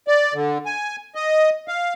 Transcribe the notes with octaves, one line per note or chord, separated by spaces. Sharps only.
D5
D3
G#5
D#5
F5